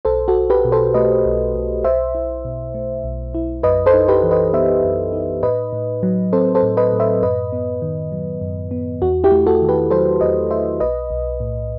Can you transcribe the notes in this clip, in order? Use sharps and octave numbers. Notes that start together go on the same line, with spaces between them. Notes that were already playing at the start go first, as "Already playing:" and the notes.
B1 A4 C5
F#4 A4
B1
G4 B4
B2
A4 C5
A3 B4 D#5
B1
B1
B1 C5 E5
E4
B2
A3
B1
E4
F#2 B4 D#5
A4 C5
D#4
G4 B4
E3
B4 D#5
B3 C5 E5
F#2
D#4
A2 B4 D#5
A2
F#3
C4 A4 C5
A4 C5
A2
B4 D#5
A2
C5 E5
F#2 B4 D#5
B3
D#3
F#3
F#2
B3
E2 F#4
E4 G4
A3
F#4 A4
D#3
G4 B4
F#3 A4 C5
E2 B4 D#5
A3 C5 E5
B1 B4 D#5
B1
A2